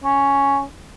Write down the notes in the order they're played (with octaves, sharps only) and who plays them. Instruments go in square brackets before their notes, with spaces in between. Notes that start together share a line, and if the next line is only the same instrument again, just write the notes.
[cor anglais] C#4